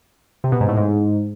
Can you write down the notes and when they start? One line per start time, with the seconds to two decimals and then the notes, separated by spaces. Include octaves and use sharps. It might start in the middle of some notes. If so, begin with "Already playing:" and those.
0.44 C3
0.52 B2
0.60 G#2
0.69 A2
0.77 G#2